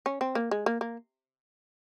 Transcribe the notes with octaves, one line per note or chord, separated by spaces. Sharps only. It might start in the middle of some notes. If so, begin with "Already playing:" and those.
C#4
C4
A#3
G#3
A#3
A#3